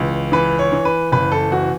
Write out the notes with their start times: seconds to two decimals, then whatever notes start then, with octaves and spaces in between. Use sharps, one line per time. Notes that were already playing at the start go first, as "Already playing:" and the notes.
Already playing: C#2 E3
0.32 E3 B4
0.59 C#5
0.72 E3
0.85 B4
1.12 F#1 B4
1.32 A4
1.52 E3 F#4